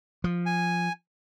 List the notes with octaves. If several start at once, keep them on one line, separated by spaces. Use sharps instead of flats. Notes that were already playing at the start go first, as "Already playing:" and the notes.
F3
G#5